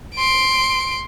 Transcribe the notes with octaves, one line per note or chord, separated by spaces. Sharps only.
C6 D7